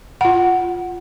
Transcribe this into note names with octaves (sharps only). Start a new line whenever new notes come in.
F4 F#5